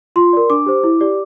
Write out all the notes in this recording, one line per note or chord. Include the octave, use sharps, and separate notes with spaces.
F4 C6
A#4 D5
D4 D6
G4 C5
E4
G4 D5